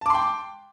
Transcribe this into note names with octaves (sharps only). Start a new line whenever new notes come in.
G5 A5 C6 D6